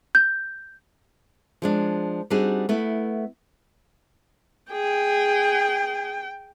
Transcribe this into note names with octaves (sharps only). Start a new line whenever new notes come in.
G6
F3 G#3 D4
G3 C4 D4 D#4 F#4 G#4
A3 B3 E4
G#4 G5